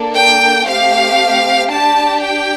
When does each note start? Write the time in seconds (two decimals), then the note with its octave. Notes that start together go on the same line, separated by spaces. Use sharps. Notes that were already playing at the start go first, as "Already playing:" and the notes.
Already playing: A#3 D4 A4
0.15 G5
0.67 A3 C4 G4 F5
1.71 D4 G4 A5
2.24 G5